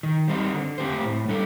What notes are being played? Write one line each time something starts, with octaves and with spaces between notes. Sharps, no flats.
D#3
G3 C4 D#4
D3
A3 C4 G4 C5
A2
G3 D4 A4